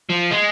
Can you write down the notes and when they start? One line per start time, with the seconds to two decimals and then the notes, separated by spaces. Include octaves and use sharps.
0.09 F3
0.31 G#3